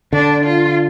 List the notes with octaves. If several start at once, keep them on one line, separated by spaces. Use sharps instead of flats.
D3 D4
F4